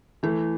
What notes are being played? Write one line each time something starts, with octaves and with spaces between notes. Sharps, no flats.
E3 A3 E4